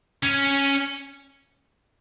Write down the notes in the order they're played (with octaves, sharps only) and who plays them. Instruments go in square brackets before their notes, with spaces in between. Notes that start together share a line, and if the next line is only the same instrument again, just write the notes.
[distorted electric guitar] C#4